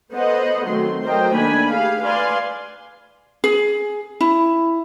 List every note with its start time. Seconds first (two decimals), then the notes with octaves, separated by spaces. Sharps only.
0.11 B3 A4 C5 D#5 F#5
0.65 D#3 F#3 A3 C4 F#4 C6
1.03 F#3 A3 A#4 C5 D#5 G5
1.32 D#3 A3 A#3 D4 G#5 B5
1.73 G4 G#4 F5
2.03 B4 D5 F5 G#5 C6
3.44 G#4
4.21 E4